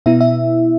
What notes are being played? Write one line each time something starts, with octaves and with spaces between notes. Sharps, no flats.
B2 B3 E4 E5
E5